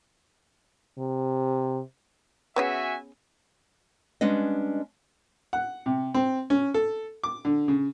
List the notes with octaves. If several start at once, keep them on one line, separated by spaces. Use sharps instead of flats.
C3
B3 C#4 F#4 G#4 E5 G#5
G3 G#3 B3 C#4 D4 D#5
F#5
C3
C4
C#4
A4
D6
D3
C#3